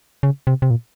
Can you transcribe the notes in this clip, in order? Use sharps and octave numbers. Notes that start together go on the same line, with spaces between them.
C#3
C3
C3
A#2